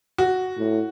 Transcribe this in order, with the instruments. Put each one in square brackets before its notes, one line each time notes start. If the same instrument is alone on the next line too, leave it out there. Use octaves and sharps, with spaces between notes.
[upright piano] F#4
[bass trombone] A2